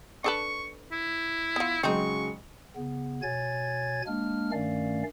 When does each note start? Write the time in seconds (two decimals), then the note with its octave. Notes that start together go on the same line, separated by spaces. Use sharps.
0.24 D4 A4 B4 C#6
0.92 E4
1.56 B3 F4
1.83 C#3 F#3 G#3 C4 D#4 C#6
2.76 C#3 B3
3.22 B2 C#5 G#5 G#6 A6
4.07 G#3 A#3 D4 F6
4.52 G2 D#3 A3 C#4 D5 F5